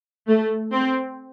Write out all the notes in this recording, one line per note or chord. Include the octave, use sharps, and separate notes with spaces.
A3
C4